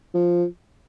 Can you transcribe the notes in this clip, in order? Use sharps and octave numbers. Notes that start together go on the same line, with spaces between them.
F3